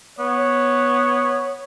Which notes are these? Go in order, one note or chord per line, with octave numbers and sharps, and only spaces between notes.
B3 C#5